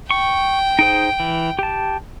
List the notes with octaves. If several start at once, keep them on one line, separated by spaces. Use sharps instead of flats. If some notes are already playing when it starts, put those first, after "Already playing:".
G5 C#6
D#4 G#4 C5 D7
E3
G4 A5